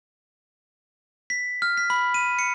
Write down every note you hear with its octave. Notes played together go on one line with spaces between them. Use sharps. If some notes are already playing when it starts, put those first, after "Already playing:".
B6
F6
B6
B5
D#7
C#7